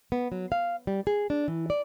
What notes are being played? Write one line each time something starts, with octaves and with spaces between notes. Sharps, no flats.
B3
F#3
F5
G3
G#4
D4
E3
D5